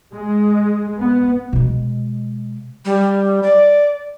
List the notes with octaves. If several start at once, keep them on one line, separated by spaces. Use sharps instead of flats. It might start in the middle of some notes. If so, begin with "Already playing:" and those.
G#3
B3
B2 G#3
G3
D5